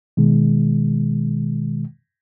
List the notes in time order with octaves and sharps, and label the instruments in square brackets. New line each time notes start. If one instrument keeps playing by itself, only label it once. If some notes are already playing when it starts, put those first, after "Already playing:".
[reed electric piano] B2 D#3 G#3